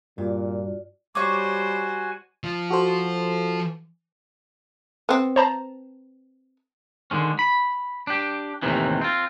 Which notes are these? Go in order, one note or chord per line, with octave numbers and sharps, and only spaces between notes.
G2 A#2 F4 F#4 D5
G3 F#4 C5 C#5 G#5 C#6 D6
F3 F4
F#4 A4 C5
B3 C4
C5 A5 A#5
D3 D#3 G#3 C#4
B5
D4 G4
D#2 A2 C3 D#3 E3
C4 F4